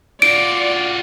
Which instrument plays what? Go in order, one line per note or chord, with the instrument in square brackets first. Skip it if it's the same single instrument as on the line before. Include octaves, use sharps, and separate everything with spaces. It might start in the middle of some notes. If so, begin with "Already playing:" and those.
[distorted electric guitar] F4 F#4 [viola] D5 [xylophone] D7